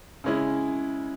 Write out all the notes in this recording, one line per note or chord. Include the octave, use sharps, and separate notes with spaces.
C#3 G#3 C#4 E4